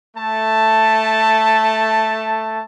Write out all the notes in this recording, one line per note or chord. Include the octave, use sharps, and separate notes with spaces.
A3 A5